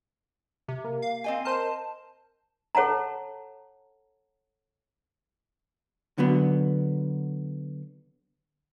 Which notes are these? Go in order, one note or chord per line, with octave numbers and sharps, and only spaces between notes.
C3
A#3
F5
C4 D#5 G#5
A#4 C5 A5 D#7
A4 C#5 F#5 A5 A#5
D3 F#3 B3